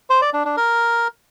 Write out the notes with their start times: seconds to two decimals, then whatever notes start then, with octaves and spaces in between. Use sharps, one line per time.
0.10 C5
0.22 D5
0.33 D4
0.45 D4
0.57 A#4